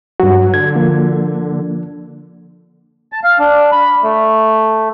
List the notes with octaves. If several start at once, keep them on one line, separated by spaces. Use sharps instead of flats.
G2 F#3 F#4
D3 G#6
F3 A#3
A5
F5
D4
B5
A3